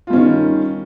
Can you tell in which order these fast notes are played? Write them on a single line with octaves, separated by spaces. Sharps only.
F4 G3 C#4 D#3